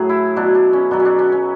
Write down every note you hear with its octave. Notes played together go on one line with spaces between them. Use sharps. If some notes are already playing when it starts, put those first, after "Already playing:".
Already playing: A2 F#3 G#4
E4
B2 F#3 D4
D4
C#4
B2 F#3 D4
C#4
D4
C#4
C#4